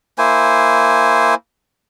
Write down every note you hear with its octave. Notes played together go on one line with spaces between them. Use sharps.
A#3 E4 C5 G#5